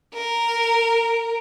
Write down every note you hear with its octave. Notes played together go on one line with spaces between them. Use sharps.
A#4